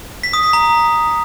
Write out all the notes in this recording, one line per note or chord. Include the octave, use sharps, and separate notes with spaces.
B6
D#6
B6
A#5